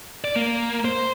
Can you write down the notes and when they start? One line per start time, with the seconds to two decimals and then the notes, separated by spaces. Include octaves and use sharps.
0.24 D5
0.36 A#3
0.85 C5